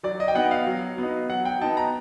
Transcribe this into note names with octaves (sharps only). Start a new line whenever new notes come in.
F#3 D5
D#5
G5
B3 D#4 F#5
F5
F#3
B3 D#4
F#3 F#5
G5
B3 D#4 A5
A#5